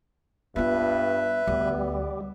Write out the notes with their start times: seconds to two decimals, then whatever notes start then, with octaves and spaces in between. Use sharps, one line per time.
0.56 G2 B3 F4 B4 E5
1.47 D2 G3 B3